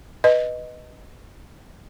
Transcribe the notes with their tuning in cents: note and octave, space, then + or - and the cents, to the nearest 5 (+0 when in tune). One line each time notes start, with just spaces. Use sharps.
B4 +0 D#5 -5